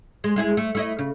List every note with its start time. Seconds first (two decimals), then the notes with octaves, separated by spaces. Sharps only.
0.24 G#3
0.36 G#3 E4 G#4
0.57 A3
0.75 A3 E4 D#5
0.99 C#3